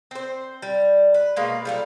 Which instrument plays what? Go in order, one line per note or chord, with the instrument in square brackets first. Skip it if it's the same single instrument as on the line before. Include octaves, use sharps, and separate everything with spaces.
[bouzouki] C4 C5
G3
B4
B2 G#3 A#3 B4
F3 G3 A3